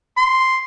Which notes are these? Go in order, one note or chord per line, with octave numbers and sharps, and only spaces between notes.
C6